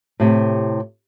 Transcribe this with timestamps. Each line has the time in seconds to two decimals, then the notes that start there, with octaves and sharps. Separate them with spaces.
0.20 A2 C3